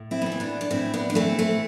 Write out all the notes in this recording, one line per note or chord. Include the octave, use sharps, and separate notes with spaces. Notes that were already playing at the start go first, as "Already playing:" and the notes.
Already playing: A2
C4 E4
B3
E3
C4
B3 D4
D4
A2 C4 E4
B3 D4
D4
E3 A3 C4
A3 C4